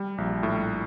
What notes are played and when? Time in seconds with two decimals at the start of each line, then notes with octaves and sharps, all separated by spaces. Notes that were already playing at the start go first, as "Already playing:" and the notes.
Already playing: G3
0.18 A#1
0.43 A2